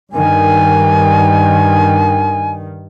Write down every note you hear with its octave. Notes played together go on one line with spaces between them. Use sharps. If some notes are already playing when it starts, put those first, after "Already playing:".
G2 D#3 G#5